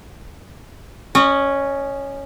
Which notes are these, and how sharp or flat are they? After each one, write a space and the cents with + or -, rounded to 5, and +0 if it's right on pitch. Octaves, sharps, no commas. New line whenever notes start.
C#4 +0 D#5 -35